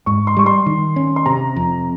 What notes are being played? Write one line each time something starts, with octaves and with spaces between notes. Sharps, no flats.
G#2 C#6
C6
G3 C#6
C6
D#3
C#4
C6
C3 A#5
F2